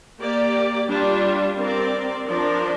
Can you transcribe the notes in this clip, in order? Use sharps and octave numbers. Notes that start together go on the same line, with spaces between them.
A#3 G4 D5
G3 D4 F4
C4 A#4 D5
F3 D4 A#4 D5